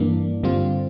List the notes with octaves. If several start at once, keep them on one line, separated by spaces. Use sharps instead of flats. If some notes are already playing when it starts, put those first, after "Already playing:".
Already playing: G2 E3 A#3 D4
G2 D3 G3 C4 F4